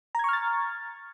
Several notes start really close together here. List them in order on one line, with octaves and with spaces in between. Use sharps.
A#5 G#6 C#6 F6 A6